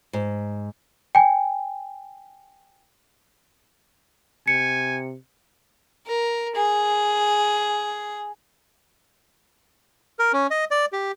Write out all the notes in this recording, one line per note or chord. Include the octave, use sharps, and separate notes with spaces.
G#2
G5 G#5
C3 G#5 C#7
A#4
G#4
A#4
C#4
D#5
D5
G4